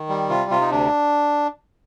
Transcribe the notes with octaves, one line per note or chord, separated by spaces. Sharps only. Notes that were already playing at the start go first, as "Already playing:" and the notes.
Already playing: D#3
G3
C3 F4
C3 F4
D#4
D2 D4